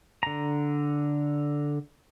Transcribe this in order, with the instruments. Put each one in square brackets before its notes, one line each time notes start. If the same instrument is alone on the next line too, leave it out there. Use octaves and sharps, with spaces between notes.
[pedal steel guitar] D3 A#5